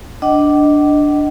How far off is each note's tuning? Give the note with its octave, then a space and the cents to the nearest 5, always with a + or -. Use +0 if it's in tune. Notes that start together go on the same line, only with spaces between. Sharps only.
D4 +0 D#5 +0 F#5 +45